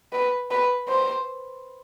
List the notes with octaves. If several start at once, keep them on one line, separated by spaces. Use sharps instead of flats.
B4
B4
C5